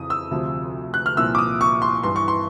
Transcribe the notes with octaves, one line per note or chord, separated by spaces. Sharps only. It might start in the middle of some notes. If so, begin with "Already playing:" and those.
Already playing: F2 C#3 E3 D#6
E6
D2 C3 F3
F#6
F6
C2 A#2 F3 E6
D6
D#6
C#6
C6
G2 E3 C6
C#6
C6